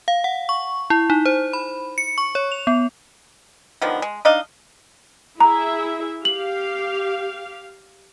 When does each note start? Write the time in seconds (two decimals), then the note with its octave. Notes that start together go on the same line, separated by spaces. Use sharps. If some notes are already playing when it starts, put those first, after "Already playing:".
0.08 F5
0.24 F#5
0.49 C#6
0.90 E4
1.10 D#4
1.25 C5
1.53 B5
1.98 C#7
2.18 C#6
2.35 C#5
2.52 F7
2.67 B3
3.82 D3 D#3 F3 B3
4.02 G#3
4.25 D4 D#4 D#5 F5
5.40 E4 G#4 E5 A#5
6.25 G4 F5 F#7